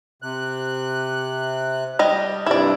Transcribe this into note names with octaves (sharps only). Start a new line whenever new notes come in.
C3 F#6
G3 D#5
G2 C3 E4 D5